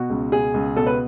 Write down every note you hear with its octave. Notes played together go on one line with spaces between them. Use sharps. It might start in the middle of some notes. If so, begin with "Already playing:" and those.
Already playing: B2 F#4
C#2
B2 G#4
C#2
B2 A4
B4